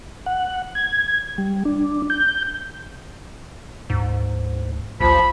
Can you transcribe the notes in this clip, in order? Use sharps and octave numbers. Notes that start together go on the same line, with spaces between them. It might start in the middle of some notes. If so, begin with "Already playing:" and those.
F#5
G#6
G3
D4
G6
D2 G#2
A#1 D#2 F3 B5